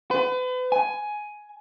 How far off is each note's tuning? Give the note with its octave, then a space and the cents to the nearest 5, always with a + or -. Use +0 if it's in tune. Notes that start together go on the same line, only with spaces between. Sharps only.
B4 +40
G#5 +10